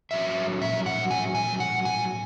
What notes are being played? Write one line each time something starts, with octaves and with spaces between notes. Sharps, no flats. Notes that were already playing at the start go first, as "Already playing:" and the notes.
A#2 F#3 C#4 E5
E5
F#5
G#5
G#5
F#5
G#5